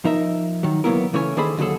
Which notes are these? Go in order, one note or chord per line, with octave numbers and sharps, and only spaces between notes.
F3 D#4 A#4 E5
D#3 F#3
D2 F#3 A#3 B3 E4 A#4
C#3 E3 A3 C#4 C#5 G#5
D#3 D4 G#4 A4 C5 B5
D#2 D3 F#3 G#4 A4